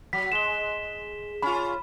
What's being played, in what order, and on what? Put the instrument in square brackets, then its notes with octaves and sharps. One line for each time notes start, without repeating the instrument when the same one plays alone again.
[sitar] F#3 [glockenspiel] B6
[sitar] G#3 [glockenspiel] E7 G7
[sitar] C#4 F4 [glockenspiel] B5